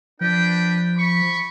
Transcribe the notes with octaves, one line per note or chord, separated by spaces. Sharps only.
F3 D4 B4 G5
B5 C#6